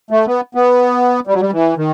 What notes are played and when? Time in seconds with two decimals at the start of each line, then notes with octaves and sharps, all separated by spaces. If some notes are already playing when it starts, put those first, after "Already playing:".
0.11 A3
0.27 B3
0.55 B3
1.27 G3
1.34 F#3
1.41 G3
1.52 E3
1.77 D#3